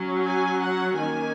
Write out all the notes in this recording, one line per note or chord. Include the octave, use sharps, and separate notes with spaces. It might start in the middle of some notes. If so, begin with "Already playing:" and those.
Already playing: F#3 C#4
G#5
F#5
D#3 A#3 C#4 G#5